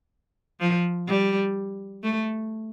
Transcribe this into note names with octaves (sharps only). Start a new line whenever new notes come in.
F3
G3
A3